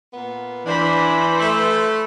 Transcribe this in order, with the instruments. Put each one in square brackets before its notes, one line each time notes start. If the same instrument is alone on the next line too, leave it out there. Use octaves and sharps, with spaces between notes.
[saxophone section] A#2 B3
[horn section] E3 [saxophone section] D4 [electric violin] C5 B5
[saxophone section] A3